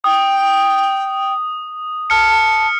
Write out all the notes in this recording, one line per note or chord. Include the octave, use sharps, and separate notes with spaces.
G5 D#6
A5 F6 C#7